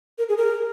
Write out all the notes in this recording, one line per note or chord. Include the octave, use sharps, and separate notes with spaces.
A#4
G#4
A#4